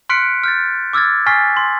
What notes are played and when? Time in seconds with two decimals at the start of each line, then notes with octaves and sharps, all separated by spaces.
0.09 C6 F6 F#6 B6 C#7 D7
0.44 F6 G6 A6
0.93 D6 E6 F6 G#6 A6
1.26 G#5 C#6 F6 A6 B6 C7
1.57 C6